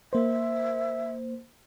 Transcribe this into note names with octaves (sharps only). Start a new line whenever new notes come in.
A#3 C5 E5